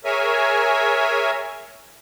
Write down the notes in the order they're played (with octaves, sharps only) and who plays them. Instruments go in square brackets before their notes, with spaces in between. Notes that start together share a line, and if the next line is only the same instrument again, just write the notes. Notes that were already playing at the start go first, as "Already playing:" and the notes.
[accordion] G#4 A#4 C#5 E5 G#5